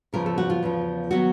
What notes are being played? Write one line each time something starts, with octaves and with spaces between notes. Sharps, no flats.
E2 C#3 F3 A#4
A4
F#4
F4
E2 C#3 F3
D#3 F#3 B3 F#4